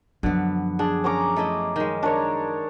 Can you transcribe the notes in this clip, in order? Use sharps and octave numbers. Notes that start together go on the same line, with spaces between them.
F#2 D3 F3 B3
D4 G#4
C#4 A#5 D6
A3 E4 D#5
D#3 G#3
D4 A#4 C#5